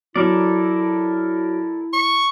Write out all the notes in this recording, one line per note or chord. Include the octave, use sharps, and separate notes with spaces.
F#3 E4 A4 A#4 D5
C#6